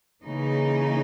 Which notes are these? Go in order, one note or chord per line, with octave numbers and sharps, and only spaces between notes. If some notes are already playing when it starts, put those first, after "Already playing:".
C#3 E3 A#3 D#4